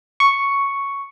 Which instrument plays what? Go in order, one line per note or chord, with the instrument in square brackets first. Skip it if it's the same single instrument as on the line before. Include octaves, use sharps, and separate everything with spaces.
[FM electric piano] C#6